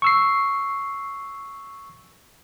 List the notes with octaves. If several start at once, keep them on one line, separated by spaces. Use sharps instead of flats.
C#6 E6 C7